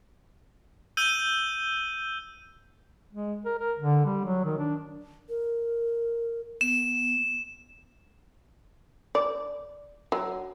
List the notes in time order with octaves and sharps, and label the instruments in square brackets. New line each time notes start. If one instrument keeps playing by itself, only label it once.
[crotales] E6 G6 D#7 G7
[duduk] G#3
A#4
A#4
D3
G3
F#3
D#3
D4
[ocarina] A#4
[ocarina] B3 [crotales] E7
[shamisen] D5
F#3